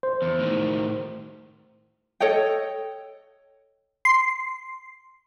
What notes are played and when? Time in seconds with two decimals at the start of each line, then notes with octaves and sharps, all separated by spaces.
0.03 C5
0.22 E2
0.39 A2 D#3
2.20 A4 C#5 D#5 G5
4.05 C6